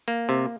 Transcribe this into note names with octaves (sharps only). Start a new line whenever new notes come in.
A#3
C3